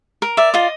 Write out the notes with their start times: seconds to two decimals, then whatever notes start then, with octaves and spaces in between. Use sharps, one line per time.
0.22 A#4
0.37 D5 E5
0.54 F4 D#5